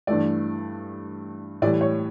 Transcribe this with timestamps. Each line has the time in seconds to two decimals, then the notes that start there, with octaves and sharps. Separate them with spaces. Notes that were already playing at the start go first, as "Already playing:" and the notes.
0.07 G2 E3 A3 D5
1.62 A2 E3 G3 D5
1.81 C#5